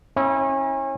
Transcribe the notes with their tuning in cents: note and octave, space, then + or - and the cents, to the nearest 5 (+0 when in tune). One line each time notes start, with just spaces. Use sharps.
C#4 -35 E4 -40